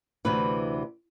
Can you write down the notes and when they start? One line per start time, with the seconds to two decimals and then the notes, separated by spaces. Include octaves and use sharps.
0.25 D2 C3 E3 B4